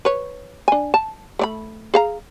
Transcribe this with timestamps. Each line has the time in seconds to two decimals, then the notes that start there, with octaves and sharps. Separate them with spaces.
0.05 B4 C#5
0.68 D4 G#5
0.94 A5
1.39 A3 D5 B5
1.94 G#4 F5 A#5